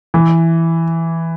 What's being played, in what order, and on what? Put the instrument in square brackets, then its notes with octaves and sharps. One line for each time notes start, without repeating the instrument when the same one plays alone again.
[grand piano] E3